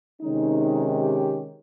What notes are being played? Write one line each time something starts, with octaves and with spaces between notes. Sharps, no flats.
C3 D#3 G#3 C#4 D#4
G4